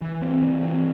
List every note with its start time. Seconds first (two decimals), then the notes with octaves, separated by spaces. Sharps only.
0.02 E3
0.22 C4
0.42 E3
0.63 C4